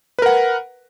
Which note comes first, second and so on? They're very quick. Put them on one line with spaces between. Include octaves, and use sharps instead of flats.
B4 A#4 F#5